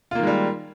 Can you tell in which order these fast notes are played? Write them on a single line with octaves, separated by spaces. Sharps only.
F4 A#3 D#3 G#3 G3